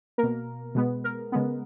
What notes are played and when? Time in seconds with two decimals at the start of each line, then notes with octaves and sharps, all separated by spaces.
0.18 A#3 A#4
0.23 B2
0.75 B2 G#3 B3
1.04 A#4
1.32 C#3 G#3 B3